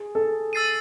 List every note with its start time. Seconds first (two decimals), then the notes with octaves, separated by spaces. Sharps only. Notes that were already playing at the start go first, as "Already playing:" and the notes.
Already playing: G#4
0.15 A4
0.53 E6 A6 C7 D#7